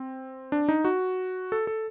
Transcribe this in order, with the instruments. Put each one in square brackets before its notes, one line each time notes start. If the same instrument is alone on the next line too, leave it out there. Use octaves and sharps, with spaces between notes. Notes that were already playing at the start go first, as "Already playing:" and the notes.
Already playing: [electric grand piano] C4
D4
D#4
F#4
A4
A4